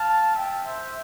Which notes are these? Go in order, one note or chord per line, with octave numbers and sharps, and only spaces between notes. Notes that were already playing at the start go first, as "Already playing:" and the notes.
Already playing: F5 A5
E5 G5
C5 E5